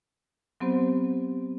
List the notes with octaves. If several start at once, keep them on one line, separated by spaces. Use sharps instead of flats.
F#3 B3 C4 G4 C5